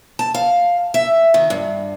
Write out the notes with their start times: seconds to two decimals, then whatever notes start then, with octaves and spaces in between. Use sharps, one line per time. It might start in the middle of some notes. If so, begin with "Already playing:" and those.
0.19 A5
0.34 F5
0.94 E5
1.34 D#3
1.50 G2